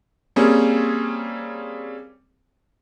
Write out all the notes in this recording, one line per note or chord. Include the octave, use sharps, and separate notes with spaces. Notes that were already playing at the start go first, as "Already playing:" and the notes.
G3 A#3 C4 C#4 G#4